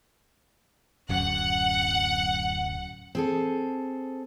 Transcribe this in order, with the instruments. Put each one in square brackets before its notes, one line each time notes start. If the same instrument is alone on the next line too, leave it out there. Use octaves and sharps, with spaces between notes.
[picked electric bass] D1 F#2 [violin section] F#5
[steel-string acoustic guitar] C4 G#4 A4